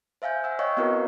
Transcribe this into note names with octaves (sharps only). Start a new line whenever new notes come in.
C5 E5 F5 G#5 G6
F#5 E6
C#5 D#5 F5 G5 C#6
B3 C4 E4 F#4 A#4 B4